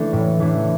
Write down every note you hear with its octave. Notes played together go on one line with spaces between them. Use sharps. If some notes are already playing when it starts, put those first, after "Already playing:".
Already playing: E3 A3 D4
A2
E3 A3 D4